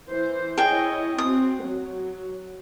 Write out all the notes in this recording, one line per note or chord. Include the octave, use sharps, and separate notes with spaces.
E3 C5
E4 G#4 C#5 D#5 G5
C4 F#4 D#6
F#3